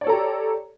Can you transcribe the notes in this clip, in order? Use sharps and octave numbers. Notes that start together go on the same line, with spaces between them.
G4 A4 C#5 D5 A#5